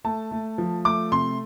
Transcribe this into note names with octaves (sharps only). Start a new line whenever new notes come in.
A3 A5
A3
F3
A3 D6
C3 C6